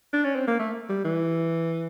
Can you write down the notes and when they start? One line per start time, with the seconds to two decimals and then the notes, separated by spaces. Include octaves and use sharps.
0.13 D4
0.24 C#4
0.35 C4
0.47 A#3
0.59 A3
0.89 G3
1.04 E3